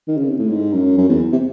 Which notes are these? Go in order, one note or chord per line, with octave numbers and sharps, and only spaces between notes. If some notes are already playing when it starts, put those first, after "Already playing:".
D#3
C#3
C3
A2
G#2
F#2
F#2
E2
C3